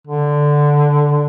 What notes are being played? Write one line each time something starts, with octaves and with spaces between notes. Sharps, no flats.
D3